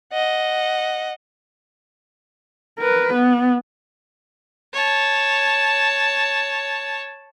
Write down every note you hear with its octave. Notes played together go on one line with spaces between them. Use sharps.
D#5 F#5
A#4 B4
B3
C#5 A5